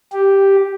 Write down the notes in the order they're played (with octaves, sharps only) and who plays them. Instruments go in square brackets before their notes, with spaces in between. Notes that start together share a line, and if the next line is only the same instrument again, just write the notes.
[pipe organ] G4